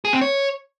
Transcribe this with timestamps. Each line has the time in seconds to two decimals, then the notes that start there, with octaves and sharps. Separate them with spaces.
0.05 G#4
0.13 C4
0.21 C#5